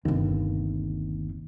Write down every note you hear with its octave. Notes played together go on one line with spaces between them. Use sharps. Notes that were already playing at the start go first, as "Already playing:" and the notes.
G1 D#2 C3